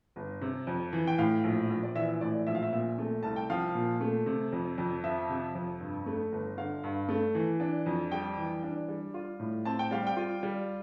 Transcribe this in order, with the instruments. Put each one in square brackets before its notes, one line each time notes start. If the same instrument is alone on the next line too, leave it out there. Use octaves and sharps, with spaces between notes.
[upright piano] G1
C3
F2
E3
G5
A2 F5
A#1
A#1
D5
E3 E5
A2 D5
A#1 E5
F5
E5
A#2 E5
A3
C2 A5
G5
F3 F5
A#2
A3
C3
F2
F2
F3 E5
C3
F2
G2
A3
G1
D3 F5
G2
A3
E3
D4
F2
G3 G5
E3
D4
G3
F4
A2
C4 A5
G5
G3 F5
G5
F4
G3